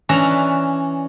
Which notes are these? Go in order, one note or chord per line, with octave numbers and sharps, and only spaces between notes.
E3 C#4 D4 E5 A#5